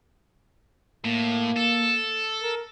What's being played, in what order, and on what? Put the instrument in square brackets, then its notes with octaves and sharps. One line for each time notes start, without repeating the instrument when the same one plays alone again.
[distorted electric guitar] A2 [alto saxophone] A#3
[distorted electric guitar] A4
[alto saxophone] A#4